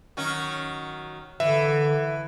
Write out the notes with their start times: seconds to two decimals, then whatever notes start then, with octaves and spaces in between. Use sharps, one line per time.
0.17 D#3 F#3 C#4
1.40 D3 E3 E5